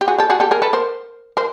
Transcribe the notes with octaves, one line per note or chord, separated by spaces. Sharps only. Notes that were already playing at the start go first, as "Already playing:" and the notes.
G4
F#4 G#4
G4 A4
F#4 G#4
G4 A4
G#4 A#4
A4 B4
A#4 C5
A#4 C5